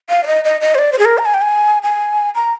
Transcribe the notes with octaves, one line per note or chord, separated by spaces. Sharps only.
F5
D5
D#5
D#5
D#5
C5
D5
C5
G#4
A#4
A#5
G#5
G5
G#5
G#5
A#5